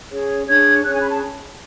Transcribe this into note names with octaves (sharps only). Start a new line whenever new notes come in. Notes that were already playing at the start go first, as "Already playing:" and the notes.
C#4 G#4 C#5
D4 G#4 C#5 G#6
C#4 G#4 C#5 F#6
G#5
B5
A5